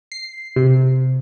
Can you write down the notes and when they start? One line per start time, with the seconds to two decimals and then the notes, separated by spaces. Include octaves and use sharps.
0.12 C7
0.56 C3